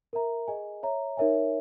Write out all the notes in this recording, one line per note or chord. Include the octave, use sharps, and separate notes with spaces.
A#4 E5 A#5
G#4 D#5 G#5
C#5 E5 A#5
D#4 A#4 C#5 E5 G#5